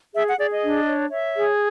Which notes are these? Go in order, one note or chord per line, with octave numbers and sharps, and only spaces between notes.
G#4 E5
F#5
G#4 D5
D#5
D4
C#5
C#5 E5
G#4